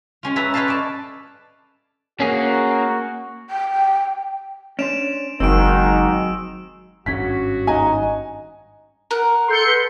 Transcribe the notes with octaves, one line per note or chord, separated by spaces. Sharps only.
G#3 C#4 F4
B4 C#5 E5 A5 A#5
A4 B4 C#5 D#5 F5 A5
D5 A5
A#3 C#4 F#4 G#4
G5
C#4 D4 C5 D7 E7 F7
F#1 G#2 D#3 F#3 C4 E6 D7
G#1 G2 C#4 F#4 G#6 B6
D#4 D#5 G#5 A#5
A#4 F#5
A4 C6 G6 C#7
B4